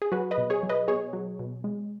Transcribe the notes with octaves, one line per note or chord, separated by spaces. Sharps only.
G#4
F#3 F#4 B4
B4 D#5
B2
G#4 C#5
F#3
B4 D#5
B2 G#4 C#5
F#3
B2
G#3